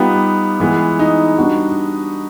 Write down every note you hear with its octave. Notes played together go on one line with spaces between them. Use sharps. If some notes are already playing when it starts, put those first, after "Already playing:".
Already playing: G3 B3 D#4 F4 G4
E3 G#3 B3
D#4
G3 B3 D4 F#4